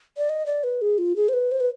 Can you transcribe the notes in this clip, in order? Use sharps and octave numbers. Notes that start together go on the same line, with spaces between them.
D5
D#5
D5
B4
G#4
F4
G#4
C5
B4
C5
B4